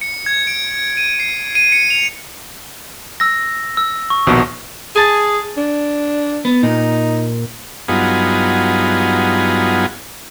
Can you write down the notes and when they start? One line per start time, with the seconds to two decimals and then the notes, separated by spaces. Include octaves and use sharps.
0.01 C#7
0.26 G#6
0.47 D7
0.97 D#7
1.20 C7
1.55 D#7
1.72 C#7
1.90 F7
3.20 E6 A#6
3.77 E6
4.10 C#6
4.27 A#1 D#2 B2
4.96 G#4 G#5 A5
5.57 D4
6.45 B3
6.63 A#2 D#4
7.88 G2 F#3 B3 D#4 F4 G#4